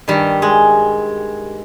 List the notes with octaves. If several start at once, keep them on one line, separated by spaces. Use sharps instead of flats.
G2 D#3 G3
G#3